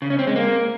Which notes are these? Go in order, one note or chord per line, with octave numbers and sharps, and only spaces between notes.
C#3
C#4
C4
G#3
A#3